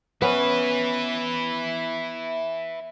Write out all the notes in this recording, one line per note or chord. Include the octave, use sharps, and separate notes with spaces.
B3 C#4 E4 B4